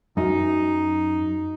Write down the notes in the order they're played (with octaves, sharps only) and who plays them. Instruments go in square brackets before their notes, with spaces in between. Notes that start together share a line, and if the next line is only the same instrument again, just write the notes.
[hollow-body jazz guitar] F#2 [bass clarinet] D#4